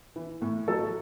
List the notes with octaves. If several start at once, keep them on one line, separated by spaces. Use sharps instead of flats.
E3
A2
F#3 A4